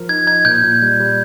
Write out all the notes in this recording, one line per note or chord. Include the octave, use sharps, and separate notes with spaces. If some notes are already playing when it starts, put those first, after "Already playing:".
Already playing: F3 F4 A#4
D#4 G#6
D#4 G#6
A#2 G6
A#2
G3
G3